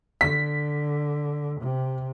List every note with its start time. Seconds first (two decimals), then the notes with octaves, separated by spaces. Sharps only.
0.21 D3 B6
1.61 C3